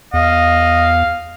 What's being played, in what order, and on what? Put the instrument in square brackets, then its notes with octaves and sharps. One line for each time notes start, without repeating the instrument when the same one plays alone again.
[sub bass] E2 [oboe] D#5 [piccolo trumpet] F5